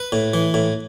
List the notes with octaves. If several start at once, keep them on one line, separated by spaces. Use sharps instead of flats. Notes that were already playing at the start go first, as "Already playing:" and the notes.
Already playing: B4
A2
E3
A2